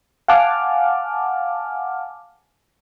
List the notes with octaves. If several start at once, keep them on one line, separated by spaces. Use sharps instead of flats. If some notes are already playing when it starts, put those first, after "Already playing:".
F5 F#5 G#5 A5 D6 F6